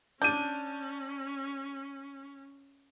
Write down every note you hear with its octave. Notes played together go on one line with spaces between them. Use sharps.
C#4 D4 G6 D#7